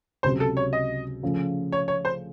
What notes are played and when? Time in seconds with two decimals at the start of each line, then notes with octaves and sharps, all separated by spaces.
0.23 C#2 C3 F#3 C5
0.40 A4
0.57 C#5
0.73 D#5
1.23 C#3 F3 A3
1.72 C#5
1.88 C#5
2.05 C5